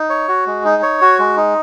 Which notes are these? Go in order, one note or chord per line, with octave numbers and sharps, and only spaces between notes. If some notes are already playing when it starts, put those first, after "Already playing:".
Already playing: D#4
C#5
F#4
G#3
D#4
C#5
F#4
G#3
D#4